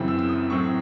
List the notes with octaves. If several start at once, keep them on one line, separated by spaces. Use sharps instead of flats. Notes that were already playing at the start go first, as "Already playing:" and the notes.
Already playing: F#2 C#3 E3 C4
E6
E6
D#6
A2 F#3 C4 C#6